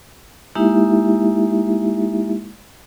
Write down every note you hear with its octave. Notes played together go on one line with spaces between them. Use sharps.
G#3 A#3 D#4 E4 G4 E5